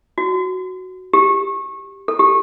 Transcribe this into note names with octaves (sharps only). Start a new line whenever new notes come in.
F#4
G4
A4
G4